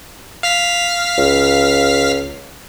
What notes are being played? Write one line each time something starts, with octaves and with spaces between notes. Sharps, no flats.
F5 F6 B6
C#2